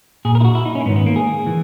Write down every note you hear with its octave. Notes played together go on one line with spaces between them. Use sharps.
A#2 G#4
A#4
E4
F#4
E4
D#4
C#4
A#3
G#2 D#3 B3
B3
A#3
G#4
E3